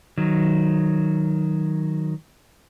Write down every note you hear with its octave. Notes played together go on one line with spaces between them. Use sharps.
D#3 F#3